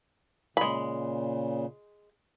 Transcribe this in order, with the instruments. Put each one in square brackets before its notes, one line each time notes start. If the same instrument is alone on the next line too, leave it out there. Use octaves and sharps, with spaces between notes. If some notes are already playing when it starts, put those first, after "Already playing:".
[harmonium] A#2 C#3 [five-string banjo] G#3 B5